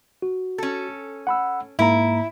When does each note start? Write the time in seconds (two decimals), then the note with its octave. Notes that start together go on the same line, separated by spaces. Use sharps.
0.22 F#4
0.58 C#4 A4
1.27 F#5 B5 E6
1.79 G#2 A#3 E4 A#5